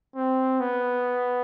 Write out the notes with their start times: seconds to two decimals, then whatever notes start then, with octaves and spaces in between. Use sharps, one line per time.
0.16 C4
0.60 B3